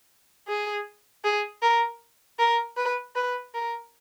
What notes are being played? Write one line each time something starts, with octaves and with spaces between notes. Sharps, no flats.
G#4
G#4
A#4
A#4
B4
B4
A#4